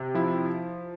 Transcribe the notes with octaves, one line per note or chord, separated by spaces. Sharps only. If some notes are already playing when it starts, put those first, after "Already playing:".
Already playing: C3
F3 E4